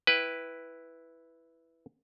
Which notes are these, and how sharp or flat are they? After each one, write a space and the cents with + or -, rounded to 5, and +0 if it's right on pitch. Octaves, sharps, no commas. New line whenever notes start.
E4 +0 B4 +0 G5 +0